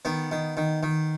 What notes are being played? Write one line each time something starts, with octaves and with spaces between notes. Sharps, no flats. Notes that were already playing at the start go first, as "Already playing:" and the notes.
D#3 B3
D#3
D#3
D#3